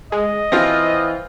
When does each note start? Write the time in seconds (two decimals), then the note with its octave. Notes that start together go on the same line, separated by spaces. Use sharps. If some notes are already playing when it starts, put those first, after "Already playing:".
0.12 G#3 D#5
0.52 E3 F3 C4 F4 A#6